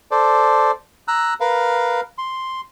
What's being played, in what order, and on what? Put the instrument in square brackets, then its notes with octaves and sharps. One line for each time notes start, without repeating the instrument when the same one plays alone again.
[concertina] A4 C5 D5
A#5 E6 F#6
A#4 B4 F5
C6